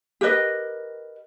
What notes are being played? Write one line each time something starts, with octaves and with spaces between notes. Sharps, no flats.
G4 A#4 B4 D#5